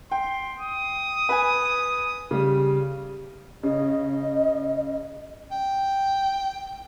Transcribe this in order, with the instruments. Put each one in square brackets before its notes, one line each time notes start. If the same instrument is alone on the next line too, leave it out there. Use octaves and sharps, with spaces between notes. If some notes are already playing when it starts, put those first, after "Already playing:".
[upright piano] G5 [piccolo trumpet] C6
[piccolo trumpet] D#6
[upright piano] B4 G#5
C#3 G3
[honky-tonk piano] C#3 [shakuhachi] D#5
[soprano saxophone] G5